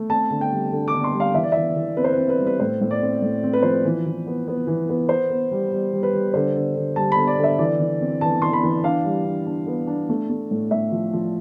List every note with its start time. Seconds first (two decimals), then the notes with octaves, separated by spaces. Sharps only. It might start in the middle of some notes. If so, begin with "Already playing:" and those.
Already playing: A3
0.10 C4 A5
0.31 D3
0.41 G5
0.51 G3
0.72 D3
0.88 D6
0.94 D3
1.04 C6
1.14 G3
1.20 F5
1.34 E3 E5
1.44 D5
1.52 E3 E5
1.76 E3
1.97 C4 B4
2.04 C5
2.13 B4
2.18 C4
2.29 B4
2.38 G3
2.47 B4
2.59 A2 C5
2.81 A2
2.91 D5
3.02 C4
3.22 A2
3.43 C4
3.53 B4
3.62 F3 C5
3.73 B4
3.85 E3
4.06 E3
4.27 B3
4.48 B3
4.67 E3
4.89 B3
5.09 B3 C5
5.30 B3
5.51 G3
5.72 G3
5.93 G3
6.03 B4
6.13 G3
6.34 D3 C5
6.55 D3
6.75 D3
6.96 G3 A5
7.12 B5
7.17 D3
7.27 D5
7.39 D3 E5
7.59 E3 D5
7.80 E3
8.01 C4
8.21 E3 A5
8.42 E3 C6
8.53 B5
8.63 E3
8.84 D4 F5
9.05 G3
9.25 D4
9.47 D4
9.67 B3
9.87 D4
10.09 A3
10.30 A3
10.51 A2
10.71 A2 E5
10.92 F3
11.13 F3